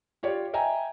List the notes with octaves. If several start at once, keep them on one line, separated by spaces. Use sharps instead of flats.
F4 G4 C#5 D5
D#5 E5 G5 G#5 A#5